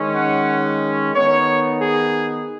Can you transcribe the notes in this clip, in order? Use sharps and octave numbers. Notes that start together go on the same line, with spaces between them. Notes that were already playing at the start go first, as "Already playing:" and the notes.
Already playing: D#3 G#3 C#4
F#5
D#3 B3 D#4 C#5
G#4